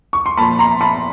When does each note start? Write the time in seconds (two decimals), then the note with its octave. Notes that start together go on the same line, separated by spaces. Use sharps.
0.13 C#6
0.26 C6
0.38 A#2 F3 A#3 A5 B5
0.59 A#5 C6
0.81 A5 B5